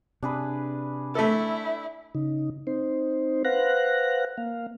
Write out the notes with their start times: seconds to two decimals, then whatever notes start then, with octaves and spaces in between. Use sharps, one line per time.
0.23 C3 D4 G#4 B4
1.15 A3 E4 A4
2.15 C#3 D#4
2.67 C4 D#4 C5
3.45 B4 C5 F5 F#5 F#6 A#6
4.38 A#3 F5